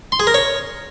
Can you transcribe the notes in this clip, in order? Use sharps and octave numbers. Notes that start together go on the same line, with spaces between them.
C6
G#4
A#4
C#5